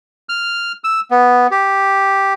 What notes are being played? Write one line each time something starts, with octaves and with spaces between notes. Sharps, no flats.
F6
E6
B3
G4